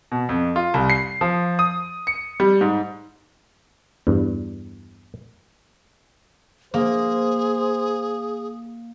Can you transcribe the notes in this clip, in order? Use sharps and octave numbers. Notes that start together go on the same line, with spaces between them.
B2
F2
F4
C2
C7
F3
D#6
C#7
G3
G#2
E2 G2
A#3 G#4 C5